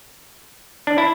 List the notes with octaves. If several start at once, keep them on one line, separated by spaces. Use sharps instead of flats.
D4
E4